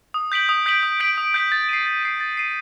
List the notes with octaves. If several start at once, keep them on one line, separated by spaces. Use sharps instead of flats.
D#6
G6 B6 D7 F#7
D#6
G6 B6 D7 F#7
D#6
G6 B6 D7 F#7
D#6
G6 B6 D7 F#7
A6
C7 D#7
A6
C7 D#7
A6
C7 D#7